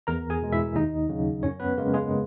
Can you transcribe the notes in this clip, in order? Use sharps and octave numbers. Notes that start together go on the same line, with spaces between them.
E2 A#4 A#5
G#4 G#5
B2 G#3
E4 E5
D#2 D#4 D#5
C#3 F#3
F#2 C#4 C#5
B3 B4
C#3 G#3 A#3 A#4
G#3 G#4